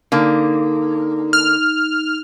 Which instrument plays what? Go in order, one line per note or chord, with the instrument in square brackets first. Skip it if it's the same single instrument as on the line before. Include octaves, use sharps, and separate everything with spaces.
[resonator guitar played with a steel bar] D3 A#3 [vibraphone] D#4
[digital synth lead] F6